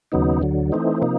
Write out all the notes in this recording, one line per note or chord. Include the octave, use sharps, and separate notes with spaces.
D#2 C#3 F#3 B3 D#4
D2 D3 F#3
E3 A3 C4 D#4
C3 F3 A#3 D#4